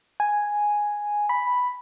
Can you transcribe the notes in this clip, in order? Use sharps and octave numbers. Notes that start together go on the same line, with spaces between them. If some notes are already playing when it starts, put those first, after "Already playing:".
G#5
B5